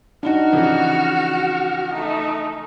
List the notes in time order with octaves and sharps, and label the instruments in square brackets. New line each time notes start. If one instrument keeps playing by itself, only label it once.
[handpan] D4 D#4 [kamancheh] F#4 F6
[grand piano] C#3 E3 F3
[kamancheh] A3 D#4